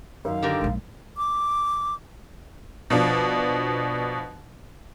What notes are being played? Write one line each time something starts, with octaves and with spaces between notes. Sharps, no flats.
F#2 D#3 F5
D3 G4 A#4
A#1 G#3
D6
B2 F3 D4